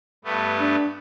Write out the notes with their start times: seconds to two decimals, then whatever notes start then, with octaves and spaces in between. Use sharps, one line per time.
0.25 G2 A3 B3
0.60 D4